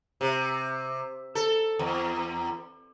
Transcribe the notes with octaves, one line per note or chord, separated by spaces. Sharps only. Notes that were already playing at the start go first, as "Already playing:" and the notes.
C3
A4
E2